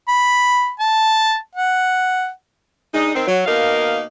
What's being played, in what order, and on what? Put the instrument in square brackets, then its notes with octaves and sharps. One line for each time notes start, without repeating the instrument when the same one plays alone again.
[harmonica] B5
A5
F#5
[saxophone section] G#3 D4 D#4
D#3 C4
F#3
B2 A#3 D#4 A#4 F5